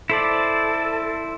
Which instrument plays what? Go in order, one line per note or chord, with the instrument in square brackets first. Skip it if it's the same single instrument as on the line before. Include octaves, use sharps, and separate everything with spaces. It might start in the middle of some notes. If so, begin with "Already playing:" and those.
[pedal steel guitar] E4 C5 D5 [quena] A4